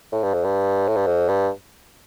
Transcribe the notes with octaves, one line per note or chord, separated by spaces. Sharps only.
A2
G2
F2
G2
A2
G2
F2
G2